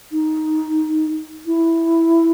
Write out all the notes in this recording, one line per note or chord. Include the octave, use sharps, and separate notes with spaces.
D#4
E4